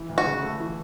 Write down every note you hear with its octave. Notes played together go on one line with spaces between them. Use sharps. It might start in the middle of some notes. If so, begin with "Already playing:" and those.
Already playing: E3
D2
F#4
C#3
A3
E3